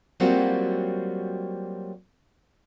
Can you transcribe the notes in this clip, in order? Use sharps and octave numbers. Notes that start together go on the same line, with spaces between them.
F#3 G3 A#3 C4 F4 F#4